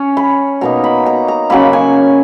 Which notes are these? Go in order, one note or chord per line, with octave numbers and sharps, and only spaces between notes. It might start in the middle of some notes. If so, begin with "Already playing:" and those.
Already playing: C#4
B5
B2 A#3 D#4 A#5
B5
A#5
A#5
C#3 F#3 A#3 B5
G#5